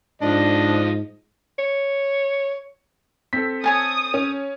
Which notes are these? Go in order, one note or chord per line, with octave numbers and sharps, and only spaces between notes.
G#2 F3 D4 D#5
C#5
C4 A4 B6
C#5 G#5 A5 D#6
C#4